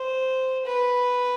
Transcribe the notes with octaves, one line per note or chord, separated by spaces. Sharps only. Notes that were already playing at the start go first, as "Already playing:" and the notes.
Already playing: C5
B4